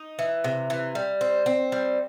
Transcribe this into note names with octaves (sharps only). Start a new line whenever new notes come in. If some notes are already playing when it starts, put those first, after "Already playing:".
Already playing: D#4
E3
C3
E3
G3
C4
C4
G3